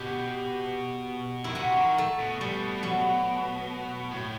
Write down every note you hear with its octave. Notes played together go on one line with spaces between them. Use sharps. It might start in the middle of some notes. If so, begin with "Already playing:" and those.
Already playing: B2 G4
D#3 E4
C3 F#4
D#3
A3
B2
B2 G3
F#3
A2